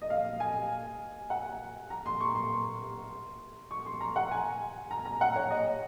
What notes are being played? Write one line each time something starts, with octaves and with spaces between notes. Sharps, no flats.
D#5
F5
G#5
F#5
A#5
C6
C#6
C6
C#6
C6
A#5
F#5
G#5
A#5
A#5
F#5
C#5
D#5